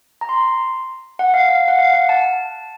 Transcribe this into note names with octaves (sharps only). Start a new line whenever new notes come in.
A#5
C6
F#5
F5
F5
F#5
F5
F#5
A5